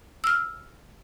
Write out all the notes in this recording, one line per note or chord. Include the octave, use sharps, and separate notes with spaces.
E6 F6